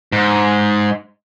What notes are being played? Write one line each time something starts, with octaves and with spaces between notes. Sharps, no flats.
G#2